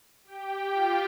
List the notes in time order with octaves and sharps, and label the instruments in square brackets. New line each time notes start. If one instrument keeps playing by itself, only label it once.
[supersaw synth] G4 G5
F4 F5